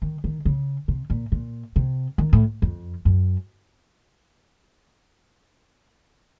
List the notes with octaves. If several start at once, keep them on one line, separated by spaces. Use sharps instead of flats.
D#3
D#3
C#3
C3
A#2
A#2
C3
D#3
A2
F2
F#2